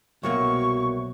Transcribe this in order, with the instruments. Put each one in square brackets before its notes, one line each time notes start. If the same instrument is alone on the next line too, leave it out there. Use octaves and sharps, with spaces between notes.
[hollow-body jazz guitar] C2 F#3 A#3 [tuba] B2 [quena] C#6